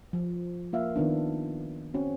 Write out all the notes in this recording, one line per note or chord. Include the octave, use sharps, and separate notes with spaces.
F3
A#3 F4 E5 F5
D#3 B3 D4
C4 C#4 F#4